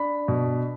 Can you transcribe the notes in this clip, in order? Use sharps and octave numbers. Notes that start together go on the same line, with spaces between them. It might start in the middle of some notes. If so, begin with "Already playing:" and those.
Already playing: D4 B5
B2